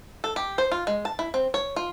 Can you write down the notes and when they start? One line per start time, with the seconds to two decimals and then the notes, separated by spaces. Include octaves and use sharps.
0.24 A4
0.36 G4
0.58 C5
0.72 F4
0.87 G#3
1.05 A5
1.19 E4
1.34 C4
1.54 C#5
1.76 F4